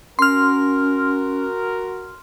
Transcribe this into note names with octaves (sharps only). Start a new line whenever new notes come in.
C#4 F#4 A#4 C6 F6